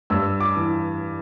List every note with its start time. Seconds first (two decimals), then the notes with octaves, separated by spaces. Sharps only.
0.10 G2 E6
0.40 D6
0.56 E3